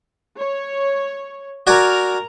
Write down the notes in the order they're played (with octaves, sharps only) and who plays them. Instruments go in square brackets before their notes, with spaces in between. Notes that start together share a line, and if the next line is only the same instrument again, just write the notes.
[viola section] C#5
[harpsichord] F#4 D5 G#5 [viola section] A#4 A#5